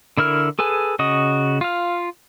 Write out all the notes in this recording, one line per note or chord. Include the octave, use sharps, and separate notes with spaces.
D3 E4 A#4 F6
G#4 A4 B4 G#5
C#3 F#4 D#5 D#6
F4 F5